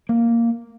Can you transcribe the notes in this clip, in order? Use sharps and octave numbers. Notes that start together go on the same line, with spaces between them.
A#3